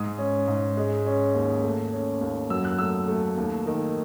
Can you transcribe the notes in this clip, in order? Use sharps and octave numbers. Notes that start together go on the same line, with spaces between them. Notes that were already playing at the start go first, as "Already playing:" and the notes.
Already playing: G#2 D#6
C#4
G#2
G#3
C#4
D#2
A3
C#4
D#2
F#2 E6
F#6
A3 E6
A3
D#2
D#3